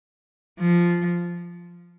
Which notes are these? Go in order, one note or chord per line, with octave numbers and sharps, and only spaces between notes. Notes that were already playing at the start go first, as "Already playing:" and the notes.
F3